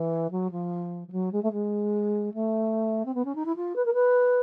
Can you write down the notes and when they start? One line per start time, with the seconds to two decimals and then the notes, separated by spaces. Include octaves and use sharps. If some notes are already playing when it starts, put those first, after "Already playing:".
Already playing: E3
0.31 F#3
0.51 F3
1.08 F3
1.12 F#3
1.32 G#3
1.43 A3
1.52 G#3
2.34 A3
3.05 C4
3.14 B3
3.25 C#4
3.35 D#4
3.45 E4
3.56 F4
3.76 B4
3.85 A#4
3.94 B4